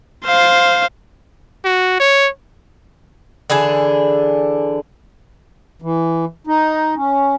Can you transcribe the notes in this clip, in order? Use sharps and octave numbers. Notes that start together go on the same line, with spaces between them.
C5 F5
F#4
C#5
D3 E3 D4 G#4
E3
D#4
C#4